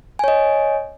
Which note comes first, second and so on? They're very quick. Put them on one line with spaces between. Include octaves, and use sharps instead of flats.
G#5 C#5 D#5